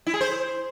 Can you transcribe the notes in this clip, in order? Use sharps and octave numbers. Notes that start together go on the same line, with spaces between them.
E4
G#4
C5